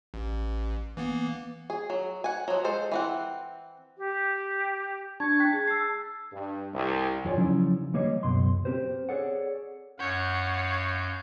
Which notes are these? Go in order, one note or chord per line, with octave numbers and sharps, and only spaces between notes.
A1
E3 A#3 B3
G#4
F#3
F#5 G#5
F3 F#3
G#3 A4 C5
E3 C4 F#5
G4
D4 A5 C#6 G#6
G5 F#6 B6
G#4 A5 G#6
E6 C7
G2
C2
E2 F4 C#5 D5 G#5
C#3 F3 F#3 C#4 D#4 E4
E3 G3 A#3 C#5 D#5 F5
C#2 F#2 B2 C6
C4 D4 G4 A#4 C5
G#4 A4 C#5 D5 F#5
F#2 C#5 F5 F#5 G6